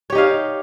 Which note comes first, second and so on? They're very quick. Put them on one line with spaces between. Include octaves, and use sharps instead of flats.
C#5 G4 D#4 F5